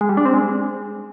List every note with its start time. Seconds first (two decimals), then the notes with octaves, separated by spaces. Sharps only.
0.01 G#3
0.09 G3
0.17 D4
0.25 C4
0.34 G#3